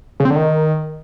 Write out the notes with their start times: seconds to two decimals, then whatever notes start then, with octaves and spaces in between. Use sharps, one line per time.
0.20 C#3
0.25 C4
0.30 D3
0.36 D#3